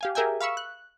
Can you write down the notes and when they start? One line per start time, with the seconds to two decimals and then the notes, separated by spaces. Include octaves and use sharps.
0.01 G4 F5 G#5
0.15 G4 G#4 A#4 E5 G5 G#5
0.41 F5 B5 C#6 E6
0.57 F#6